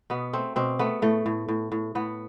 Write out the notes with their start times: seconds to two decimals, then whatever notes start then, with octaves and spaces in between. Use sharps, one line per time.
0.10 B2 B3
0.33 A3 C4
0.56 B2 C4
0.79 A3 B3
1.02 A2 A3
1.26 A2
1.48 A2
1.72 A2
1.95 A2 B3